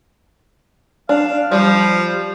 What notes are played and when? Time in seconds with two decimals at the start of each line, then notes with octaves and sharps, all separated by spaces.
1.09 D4 F5
1.52 F3 G3